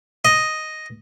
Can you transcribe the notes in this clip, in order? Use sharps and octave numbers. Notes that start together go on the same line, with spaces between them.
D#5